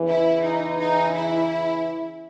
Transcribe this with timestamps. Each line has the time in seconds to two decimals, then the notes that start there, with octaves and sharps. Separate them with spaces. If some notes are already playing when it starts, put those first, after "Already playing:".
Already playing: E2 C#3 E3
0.09 E4
0.45 D#4
0.80 D#4
1.15 E4